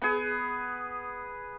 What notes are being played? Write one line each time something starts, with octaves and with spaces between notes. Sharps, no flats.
B3 G#4